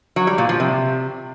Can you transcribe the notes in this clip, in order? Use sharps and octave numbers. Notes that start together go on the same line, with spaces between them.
F#3
G3
A#2
F3
C3